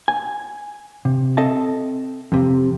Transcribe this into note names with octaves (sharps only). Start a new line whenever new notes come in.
G#5
C3
C4 A4 D#5 E5 A5
F2 C3